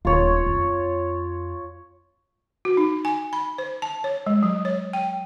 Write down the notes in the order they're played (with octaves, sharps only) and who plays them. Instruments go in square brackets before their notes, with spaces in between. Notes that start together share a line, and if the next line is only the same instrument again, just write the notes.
[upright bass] D#1 A3 [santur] F4 C#5
[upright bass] F2
[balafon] F#4
D#4
G#5
B5
C5
A5
C#5
G#3
F#3
C#5
G5